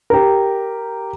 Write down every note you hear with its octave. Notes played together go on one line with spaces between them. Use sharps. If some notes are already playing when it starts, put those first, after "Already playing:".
G4 A#4